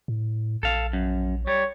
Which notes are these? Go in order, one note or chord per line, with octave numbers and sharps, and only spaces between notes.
A2
A#1 A4 F5
F#2
G3 C#5